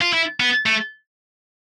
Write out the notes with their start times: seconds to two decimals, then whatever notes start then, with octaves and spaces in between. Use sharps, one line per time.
0.01 F4
0.13 E4
0.40 B3
0.66 A3